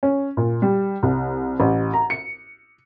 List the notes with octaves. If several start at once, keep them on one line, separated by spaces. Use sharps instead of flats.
C#4
A#2
G3
C2
A1
A#5
C#7